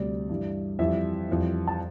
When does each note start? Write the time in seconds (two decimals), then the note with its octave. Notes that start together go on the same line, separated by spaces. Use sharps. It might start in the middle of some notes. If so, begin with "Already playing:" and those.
Already playing: D2 C3 G3 D5
0.29 G2 E3 G3
0.79 F2 E3 G3 E5
1.29 F2 E3 G3
1.68 A5